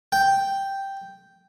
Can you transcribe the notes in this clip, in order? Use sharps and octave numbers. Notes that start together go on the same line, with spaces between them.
G5